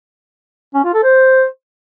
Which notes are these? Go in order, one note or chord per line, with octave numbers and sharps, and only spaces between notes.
C#4
F4
A4
C5